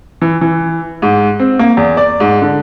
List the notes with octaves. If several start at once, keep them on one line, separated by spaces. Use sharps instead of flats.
E3
E3
G#2
C4
A#3
E2
D5
G#2
D3